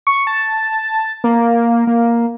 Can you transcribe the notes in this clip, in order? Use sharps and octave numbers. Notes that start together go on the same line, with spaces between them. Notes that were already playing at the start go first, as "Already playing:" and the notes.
C#6
A5
A#3
A#3